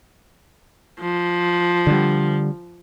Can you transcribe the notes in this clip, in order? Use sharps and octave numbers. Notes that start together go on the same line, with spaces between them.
F3
D3 G3